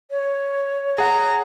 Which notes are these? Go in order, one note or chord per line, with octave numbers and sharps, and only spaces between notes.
C#5
G#4 F#5 A#5